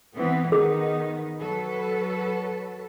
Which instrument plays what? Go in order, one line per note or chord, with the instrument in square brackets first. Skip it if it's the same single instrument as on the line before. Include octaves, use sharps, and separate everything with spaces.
[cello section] E3 B3 C4
[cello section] D#3 B3 D#4 [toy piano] G#4
[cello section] F#3 A4 B4